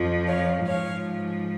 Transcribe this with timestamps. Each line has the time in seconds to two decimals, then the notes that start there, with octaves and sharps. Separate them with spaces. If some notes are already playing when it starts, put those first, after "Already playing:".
Already playing: F2 F3
0.27 C#5 F5
0.66 G#2 F3 C#5 F5